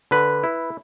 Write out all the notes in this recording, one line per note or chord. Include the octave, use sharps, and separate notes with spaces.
D3 B4
E4